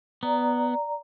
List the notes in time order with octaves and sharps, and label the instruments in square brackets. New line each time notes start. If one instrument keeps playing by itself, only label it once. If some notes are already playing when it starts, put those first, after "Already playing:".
[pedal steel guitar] B3 [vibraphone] D5 A#5